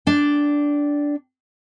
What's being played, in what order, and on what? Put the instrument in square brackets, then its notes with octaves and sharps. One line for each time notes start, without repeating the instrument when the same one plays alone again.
[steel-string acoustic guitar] D4 G5